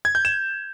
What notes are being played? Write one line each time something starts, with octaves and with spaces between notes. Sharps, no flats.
G#6
G6
E7